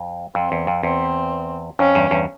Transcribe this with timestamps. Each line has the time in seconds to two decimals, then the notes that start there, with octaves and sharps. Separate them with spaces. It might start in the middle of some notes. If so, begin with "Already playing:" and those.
Already playing: F2
0.35 F2 C4
0.52 E2
0.67 F2
0.83 E2 C4
1.79 F2 C#4
1.95 E2 G2
2.11 E2 G2